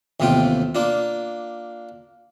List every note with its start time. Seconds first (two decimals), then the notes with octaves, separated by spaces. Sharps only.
0.20 A1 D#2 C3 B3 F4 G5
0.75 A#3 D4 F4